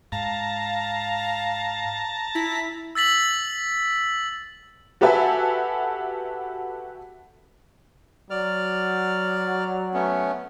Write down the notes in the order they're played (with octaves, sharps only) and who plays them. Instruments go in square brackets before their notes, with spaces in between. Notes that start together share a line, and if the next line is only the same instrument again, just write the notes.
[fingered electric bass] G#2 [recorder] F5 [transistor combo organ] A5 A#5
[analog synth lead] E4 [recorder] B6
[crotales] E6 A6 B6 F#7
[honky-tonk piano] F#4 G4 A4 B4 E5 G#5
[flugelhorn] F#3 [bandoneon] D5 F6
[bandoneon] A3 B3 C#4